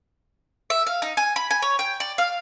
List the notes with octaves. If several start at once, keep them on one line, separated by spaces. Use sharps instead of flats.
E5
F5
D#4
G#5
B5
G#5
C#5
G5
D5
F5